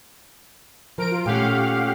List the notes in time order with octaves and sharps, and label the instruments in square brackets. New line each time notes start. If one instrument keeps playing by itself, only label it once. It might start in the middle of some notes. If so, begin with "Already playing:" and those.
[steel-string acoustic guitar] F3 [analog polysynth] A#4 D7
[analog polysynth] F4
[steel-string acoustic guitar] A#2 A3 C#4 [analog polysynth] G4 F5 F#5